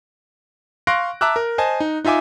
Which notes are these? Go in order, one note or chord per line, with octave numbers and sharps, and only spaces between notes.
F5 C6 C#6 F#6 A#6 D7
E5 A5 A#5 D6 E6 F#6
A#4
C5 D#5 G#5 A5
D#4
D#4 F4 E5 G#5 D6